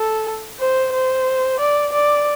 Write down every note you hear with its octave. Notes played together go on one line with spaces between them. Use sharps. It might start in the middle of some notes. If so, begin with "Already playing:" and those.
Already playing: A4
C5
C5
D5
D5